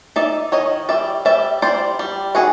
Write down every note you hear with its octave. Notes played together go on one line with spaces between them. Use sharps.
D#4 D5 E5
D#3 C#5 D#5
G3 D5 E5
G3 D5 E5
G3 C5 D5
G3
D#3 F#4 G#4